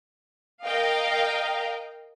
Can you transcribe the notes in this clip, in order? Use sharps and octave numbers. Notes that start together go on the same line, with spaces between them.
A#4 D#5 F5 G5